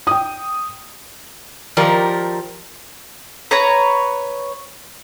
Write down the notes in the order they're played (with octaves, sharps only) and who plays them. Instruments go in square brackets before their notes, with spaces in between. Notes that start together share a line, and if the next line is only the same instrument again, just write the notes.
[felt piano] G5 D#6
[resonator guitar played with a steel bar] D#3 F3 G4 A#4 D5
[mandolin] B4 C#5 A#5